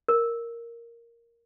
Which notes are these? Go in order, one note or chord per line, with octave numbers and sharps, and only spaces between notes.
A#4